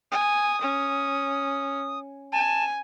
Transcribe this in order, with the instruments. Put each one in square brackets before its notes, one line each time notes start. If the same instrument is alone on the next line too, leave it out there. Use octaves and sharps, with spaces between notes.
[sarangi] G#5 [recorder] D#6
[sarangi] C#4
[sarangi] G#5 [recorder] A5